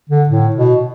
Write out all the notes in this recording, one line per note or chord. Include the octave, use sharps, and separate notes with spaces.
D3
A2
B2